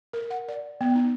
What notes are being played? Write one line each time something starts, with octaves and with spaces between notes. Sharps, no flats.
A#4
F#5
D5
B3
D#4